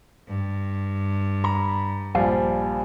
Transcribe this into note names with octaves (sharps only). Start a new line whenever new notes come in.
G2
A#5 B5
A#1 F3 G3 F5 G#5